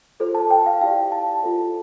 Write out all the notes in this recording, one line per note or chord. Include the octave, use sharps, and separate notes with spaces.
F4 A4 C5
A5
G5
F5
E4 G4 D5 F5
A5
F4 A4 C5